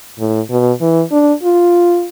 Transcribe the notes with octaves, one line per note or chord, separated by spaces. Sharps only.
A2
B2
E3
D4
F4